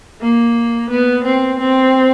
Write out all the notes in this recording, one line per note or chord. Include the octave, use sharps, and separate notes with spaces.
A#3
B3
C4
C4